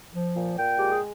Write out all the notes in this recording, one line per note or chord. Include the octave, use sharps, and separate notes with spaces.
F3
A#2
A#2 G5
G#3 G4
G#4